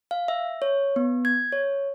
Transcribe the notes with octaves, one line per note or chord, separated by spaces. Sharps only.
F5
E5
C#5
B3
G#6
C#5